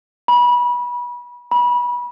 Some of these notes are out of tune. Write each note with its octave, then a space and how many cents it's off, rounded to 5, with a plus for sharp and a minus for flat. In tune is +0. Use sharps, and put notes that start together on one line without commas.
B5 -25
B5 -25